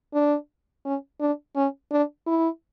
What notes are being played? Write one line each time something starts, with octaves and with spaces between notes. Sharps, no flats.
D4
C#4
D4
C#4
D4
E4